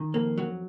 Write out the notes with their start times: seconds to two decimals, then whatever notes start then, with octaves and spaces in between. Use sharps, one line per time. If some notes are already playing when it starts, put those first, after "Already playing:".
Already playing: D#3
0.14 F2 A#3
0.38 F#3